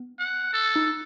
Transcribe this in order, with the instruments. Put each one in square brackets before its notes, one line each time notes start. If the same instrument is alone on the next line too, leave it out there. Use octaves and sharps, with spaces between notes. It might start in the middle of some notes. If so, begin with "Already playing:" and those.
Already playing: [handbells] B3
[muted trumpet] F#5
A4
[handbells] D#4